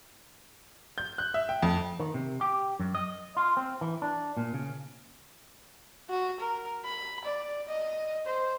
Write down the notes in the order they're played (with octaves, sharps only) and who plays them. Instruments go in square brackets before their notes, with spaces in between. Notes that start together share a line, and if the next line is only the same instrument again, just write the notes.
[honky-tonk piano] G6
F#6
E5
G5
F2
[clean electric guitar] D#3
C3
G4
F#2
D#5
F4
C4
E3
D4
A#2
C#3
[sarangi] F#4
A#4
B5
D5
D#5
C5